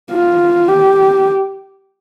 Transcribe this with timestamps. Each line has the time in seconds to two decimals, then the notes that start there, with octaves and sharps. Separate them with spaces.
0.11 F4
0.68 G4